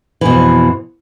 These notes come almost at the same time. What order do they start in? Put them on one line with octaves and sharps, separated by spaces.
E3 B2 F2